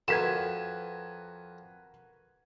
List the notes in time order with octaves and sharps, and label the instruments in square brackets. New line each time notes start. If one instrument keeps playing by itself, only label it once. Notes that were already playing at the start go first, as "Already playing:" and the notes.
[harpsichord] F2 [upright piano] F#4 A#4 B4 [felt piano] G#6 B6 E7